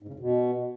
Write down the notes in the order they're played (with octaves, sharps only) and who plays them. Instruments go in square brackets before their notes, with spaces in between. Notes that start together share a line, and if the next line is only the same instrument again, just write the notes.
[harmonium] G#2
C#3
F2
B2